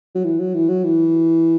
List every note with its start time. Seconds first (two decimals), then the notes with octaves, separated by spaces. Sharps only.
0.15 F#3
0.24 E3
0.39 F#3
0.54 E3
0.69 F#3
0.84 E3